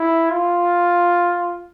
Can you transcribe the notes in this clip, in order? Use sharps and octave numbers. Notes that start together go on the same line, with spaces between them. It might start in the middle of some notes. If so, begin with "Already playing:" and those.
Already playing: E4
F4